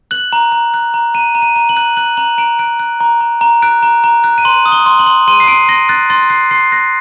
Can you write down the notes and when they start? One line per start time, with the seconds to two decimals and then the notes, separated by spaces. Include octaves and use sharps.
0.11 F#6 F#7
0.33 A#5
0.52 A#5
0.74 F#6
0.94 A#5
1.14 A#5 D#7
1.35 A#5
1.42 D#7
1.56 A#5
1.69 F#7
1.77 F#6
1.97 F#6 F#7
2.17 A#5 F#7
2.38 A#5 D7
2.59 F#6 D7
2.79 F#6
3.00 A#5
3.21 A#5
3.41 A#5
3.62 F#6 D7
3.83 A#5
4.04 A#5
4.24 F#6
4.38 D#7
4.45 C6 F#7
4.66 D#6
4.72 G7
4.86 C6
4.99 F#7
5.06 C6
5.28 C6 D#7
5.40 C7
5.48 C6 D7
5.69 C6 A#6
5.89 F#6 A6
6.10 C6 A6
6.30 F#6 C7
6.51 C6 C7
6.72 F#6 A#6